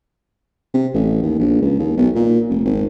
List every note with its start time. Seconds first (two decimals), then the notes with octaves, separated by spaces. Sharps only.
0.74 C3
0.94 A1
1.22 D#2
1.39 A#1
1.61 C#2
1.79 D#2
1.97 B1
2.15 A#2
2.50 F1
2.65 G#1